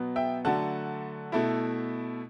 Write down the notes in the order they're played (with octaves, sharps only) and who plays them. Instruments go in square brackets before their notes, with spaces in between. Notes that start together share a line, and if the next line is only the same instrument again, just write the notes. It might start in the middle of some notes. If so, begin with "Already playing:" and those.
Already playing: [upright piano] B2 F#3 B3
E5 G5
D3 F#3 A3 F#5 A5
B2 A3 E4